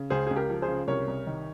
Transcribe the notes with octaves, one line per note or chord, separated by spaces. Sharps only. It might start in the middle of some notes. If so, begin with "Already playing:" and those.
Already playing: C#3
C#2 G#4 C5
C#2 G#4
G4 A#4
F3
G#4 C5
C#3
C2 A#4 C#5
C2
D#3